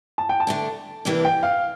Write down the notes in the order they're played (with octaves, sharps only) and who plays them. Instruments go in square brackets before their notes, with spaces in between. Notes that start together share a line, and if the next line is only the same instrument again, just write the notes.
[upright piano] A5
G5
A5
[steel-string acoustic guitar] D3 A3 D4
C3 E3 A#3 D4 G4
[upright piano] G5
F5